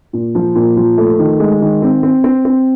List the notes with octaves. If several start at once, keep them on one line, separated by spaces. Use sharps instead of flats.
A#2
F3
A#2
F3
A3
D#3
G#3
D#3
C4
C4
C4
C4